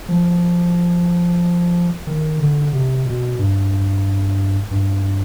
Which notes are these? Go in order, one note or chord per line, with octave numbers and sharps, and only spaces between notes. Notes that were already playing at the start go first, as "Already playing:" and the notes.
F3
D#3
D3
C3
B2
G2
G2